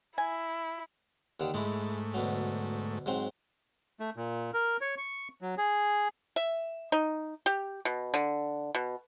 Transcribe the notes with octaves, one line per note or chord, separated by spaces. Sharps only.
E4 G#5
D#2 D3 D#3
G#2 G#3 A3 E4
D2 B2 F#3
G#2 F#3 C4
A3
A#2
A#4
C#5
C#6
F#3
G#4
E5
D#4
G4
B2
D3
B2